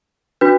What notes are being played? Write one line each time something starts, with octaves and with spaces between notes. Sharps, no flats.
D4 F#4 B4